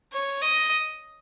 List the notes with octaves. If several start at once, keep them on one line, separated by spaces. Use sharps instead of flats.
C#5
D#5